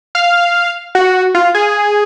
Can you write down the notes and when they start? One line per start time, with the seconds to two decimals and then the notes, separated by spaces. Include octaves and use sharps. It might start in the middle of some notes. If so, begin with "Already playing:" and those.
0.15 F5
0.95 F#4
1.35 F4
1.54 G#4